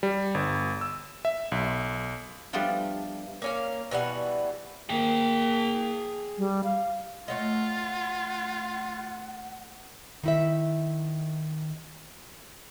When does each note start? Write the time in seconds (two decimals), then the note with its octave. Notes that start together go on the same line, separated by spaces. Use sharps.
0.03 G3
0.35 G1
0.81 E6
1.25 E5
1.52 B1
2.53 F3 G3 A3 B3 D4 F4
3.42 A#3 C#4 F5
3.91 B2 E3 G3 F#5
4.89 A#3 G#4 G5
6.38 G3
6.64 F5
7.28 A3 F4 C#5 D#5 F#5
10.23 D#3 E4 E5